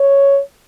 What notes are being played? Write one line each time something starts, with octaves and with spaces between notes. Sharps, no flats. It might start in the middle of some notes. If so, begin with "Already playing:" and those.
Already playing: C#5